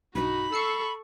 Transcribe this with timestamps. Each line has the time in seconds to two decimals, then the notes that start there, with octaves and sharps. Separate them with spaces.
0.15 B1 G2 D#4 F#4 B5
0.52 A4 C#6 E6 C7 C#7